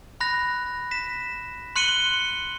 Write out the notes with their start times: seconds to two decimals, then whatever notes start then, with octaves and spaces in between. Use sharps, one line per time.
0.21 B5 F#6 A#6
0.91 B6 E7
1.76 C6 F#6 C#7 D#7 F#7 G7